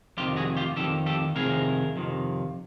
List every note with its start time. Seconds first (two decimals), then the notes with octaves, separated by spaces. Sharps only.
0.18 F2 C3 D#3 F4 G4
0.36 F#4 G#4
0.57 F4 G4
0.76 F2 C3 D#3 G4 A4
1.06 G4 A4
1.35 F2 C3 D#3 G#4 A#4
1.96 F2 C3 D#3